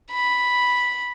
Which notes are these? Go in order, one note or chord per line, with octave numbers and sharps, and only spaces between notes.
B5